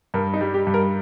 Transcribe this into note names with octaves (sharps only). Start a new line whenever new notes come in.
G2 A#4
D#4
G3
G4
G2
A#4